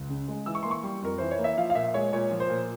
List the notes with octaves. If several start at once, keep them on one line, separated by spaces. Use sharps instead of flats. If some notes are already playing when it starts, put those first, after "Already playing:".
Already playing: C#2
C#3
G#3
E3 E6
C#6
A#3 C6
C#6
G3
F2 A#4
E3 C5
C#5
A#3
E5
F3 F5
F5
A#2 E5
G#3 C#5
A#2 C#5
F3
C5
A#2